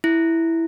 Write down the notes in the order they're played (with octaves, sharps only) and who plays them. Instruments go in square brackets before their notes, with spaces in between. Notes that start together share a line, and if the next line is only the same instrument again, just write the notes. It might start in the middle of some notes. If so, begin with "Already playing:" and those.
[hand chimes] E4